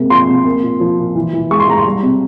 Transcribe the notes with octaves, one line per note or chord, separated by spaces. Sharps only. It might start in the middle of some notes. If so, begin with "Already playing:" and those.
Already playing: C3 G#3 A#3
F3 C6
C3
A#3
A#2
F3
A#2
E3
E3
G#3 C#6
C6
G#3 A#5
C6
G3
C3